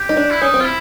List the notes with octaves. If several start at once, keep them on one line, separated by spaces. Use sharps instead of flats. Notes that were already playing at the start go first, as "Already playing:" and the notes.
Already playing: G4
D#4
D4
E4
C#4 D#4
C4
F4
E4